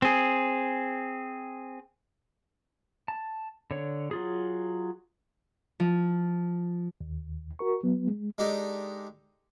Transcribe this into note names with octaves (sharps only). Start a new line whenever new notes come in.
C4 G#4
A5
D3 C#5
F#3 F4 G#4
F3
D#2
F#4 A#4 C#6
F#3 B3
G#3
G#3 D4 D#4 G4 A4